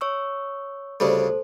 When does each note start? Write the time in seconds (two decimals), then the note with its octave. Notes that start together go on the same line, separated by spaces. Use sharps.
0.01 C#5 C#6 E6
1.00 D2 C#3 G3 A4 C5